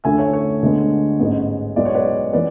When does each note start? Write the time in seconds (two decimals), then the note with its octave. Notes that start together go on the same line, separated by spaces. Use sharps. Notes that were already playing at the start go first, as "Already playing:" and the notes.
0.04 D2 D3 A3 E5 G#5
0.18 C#5 E5
0.33 C#5
0.62 D2 D3 G#3 B3
1.19 A1 G#2 G#3 B3
1.76 B1 B2 G#3 B3 D5
1.85 C#5
1.95 B4 D5
2.33 E3 B3 B4 D5